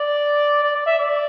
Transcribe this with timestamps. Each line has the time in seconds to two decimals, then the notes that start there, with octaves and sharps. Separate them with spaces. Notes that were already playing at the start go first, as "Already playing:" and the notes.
Already playing: D5
0.63 D5
0.75 D5
0.86 E5
0.98 D5